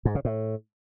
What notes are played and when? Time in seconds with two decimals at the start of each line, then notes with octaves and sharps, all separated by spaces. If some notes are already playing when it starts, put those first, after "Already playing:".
0.05 G#2
0.15 C#3
0.25 A2